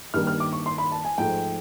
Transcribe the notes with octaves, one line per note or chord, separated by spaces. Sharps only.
G2 D#3 G3 A#3 F6
F6
D6
C#6
C6
B5
A5
G#5
G#2 F3 A3 G5